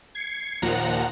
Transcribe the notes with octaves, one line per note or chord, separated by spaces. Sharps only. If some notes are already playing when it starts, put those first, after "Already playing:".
G#6 C7 C#7
D#2 A#2 F3 F#5 A#5